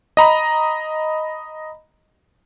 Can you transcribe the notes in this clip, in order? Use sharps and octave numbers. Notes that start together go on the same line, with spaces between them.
D#5 A#5 B5